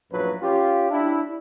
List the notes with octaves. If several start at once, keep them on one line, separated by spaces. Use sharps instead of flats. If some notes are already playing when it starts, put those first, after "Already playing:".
A#1 F#2 A2 F#3 B4
C#4 F4 G4
D4 E4